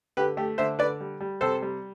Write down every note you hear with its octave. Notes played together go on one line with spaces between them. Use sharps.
D3 G4 B4
A3 G4
D3 C5 E5
D3 B4 D5
G3
G3
C3 A4 C5
G3